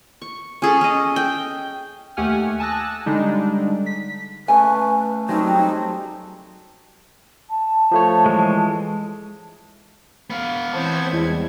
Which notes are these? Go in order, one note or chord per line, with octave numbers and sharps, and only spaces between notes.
C#6
C#4 G#4 A4
C#4 D#5
G5
D#2 A3 G4 F#5 G#5 F6
G#5 A5 D#6 E6 F#6 A#6
D3 G3 G#3 D4 D#4
B6
C#3 A3 B4 G#5
F#3 G3 A3 C4 D#4
A5
F3 A3 C#5
E3 G#3
B3 F5
E3 C4 C5 C#5 A5 G#6
E2 G3 G#3 E4